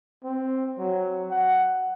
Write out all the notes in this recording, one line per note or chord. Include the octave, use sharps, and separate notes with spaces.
C4
F#3
F#5